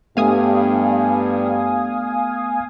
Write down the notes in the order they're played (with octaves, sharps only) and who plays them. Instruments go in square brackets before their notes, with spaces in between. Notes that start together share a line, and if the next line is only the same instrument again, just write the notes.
[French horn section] G2 G4 [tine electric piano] A3 B3 [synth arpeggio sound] F5 G#5 D#6